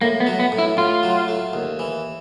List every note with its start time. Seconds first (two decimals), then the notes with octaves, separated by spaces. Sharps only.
0.01 A2 A#3
0.20 B3
0.27 F#3
0.40 B3
0.52 A2
0.59 E4
0.77 A2 F4
1.03 F#3
1.28 A3
1.53 D#2
1.79 E3